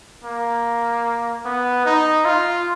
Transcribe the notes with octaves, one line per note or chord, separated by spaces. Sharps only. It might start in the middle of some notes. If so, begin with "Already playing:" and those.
A#3
B3
D#4
F4